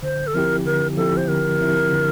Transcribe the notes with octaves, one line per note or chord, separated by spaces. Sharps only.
D3 C5
A4
F3 C4 E4 G4 A#4
D3 A#4
F3 C4 E4 G4 A4
C5
D3 A#4
F3 C4 E4 G4
D3